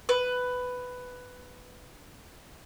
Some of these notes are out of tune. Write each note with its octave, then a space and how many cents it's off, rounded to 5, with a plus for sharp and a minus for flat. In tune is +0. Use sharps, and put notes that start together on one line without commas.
B4 +10